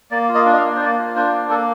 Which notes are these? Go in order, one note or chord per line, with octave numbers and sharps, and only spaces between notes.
A#3 D5
F4
D#5
D4
D#5
F5
A#3
C5
A#3 D5
F4
D4 C5
A#3
A#3 A4